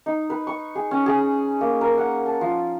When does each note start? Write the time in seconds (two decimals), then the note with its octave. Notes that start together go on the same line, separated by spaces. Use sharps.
0.06 D#4
0.30 B4
0.47 C#6
0.75 G#4
0.91 C#4
1.06 G#4
1.61 A#3
1.81 A#4
1.98 F#5
2.26 A5
2.41 F3